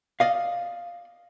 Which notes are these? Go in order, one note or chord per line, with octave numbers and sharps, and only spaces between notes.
D5 D#5 F5